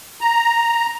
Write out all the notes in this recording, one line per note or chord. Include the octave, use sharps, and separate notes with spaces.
A#5